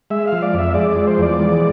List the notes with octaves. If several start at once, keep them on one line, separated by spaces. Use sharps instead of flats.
G#3 E5
F3 F5
D5
F2 E5
G#3 D5
F3 D5
C5
E2 D5
G#3